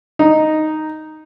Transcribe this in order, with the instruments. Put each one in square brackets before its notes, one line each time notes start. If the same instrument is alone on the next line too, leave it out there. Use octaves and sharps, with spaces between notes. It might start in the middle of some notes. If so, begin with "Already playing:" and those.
[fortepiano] D#4